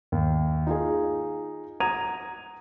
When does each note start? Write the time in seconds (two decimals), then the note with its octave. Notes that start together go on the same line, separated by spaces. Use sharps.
0.12 D#2
0.67 D#4 F4 G#4
1.80 F#5 A#5 D#6 G#6 D#7 F7